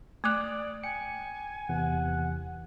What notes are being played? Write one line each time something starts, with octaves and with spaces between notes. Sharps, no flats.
A3 D5 D6 D#6 F#6
G5 G#5 C#7
E2 C3 E3 F#5